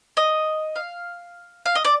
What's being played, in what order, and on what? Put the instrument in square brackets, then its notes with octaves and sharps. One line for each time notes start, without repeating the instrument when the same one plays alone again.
[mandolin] D#5
F5
F5
D#5
D5